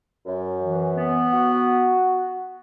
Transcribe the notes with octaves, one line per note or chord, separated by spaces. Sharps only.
F#2
E3
B3
F#4